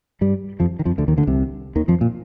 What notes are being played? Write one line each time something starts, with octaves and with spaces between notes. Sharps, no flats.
G2 G3
F2 F3
D#3
F2 F3
D2 D3
D#2 D#3
D2 D3
C2 C3
D#2 D#3
F2 F3
A#2